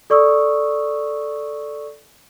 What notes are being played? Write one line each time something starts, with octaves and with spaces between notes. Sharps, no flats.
A4 D5 C#6 D#6 E6